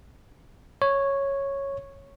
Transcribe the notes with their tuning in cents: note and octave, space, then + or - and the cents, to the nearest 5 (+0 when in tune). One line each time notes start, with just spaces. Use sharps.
C#5 -5